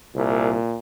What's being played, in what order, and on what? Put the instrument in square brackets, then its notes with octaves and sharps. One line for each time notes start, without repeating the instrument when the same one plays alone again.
[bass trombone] C2 [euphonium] A#2